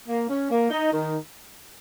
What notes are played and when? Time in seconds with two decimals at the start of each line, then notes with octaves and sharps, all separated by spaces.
0.09 A#3
0.30 C#4
0.51 A#3
0.71 D#4
0.92 D#3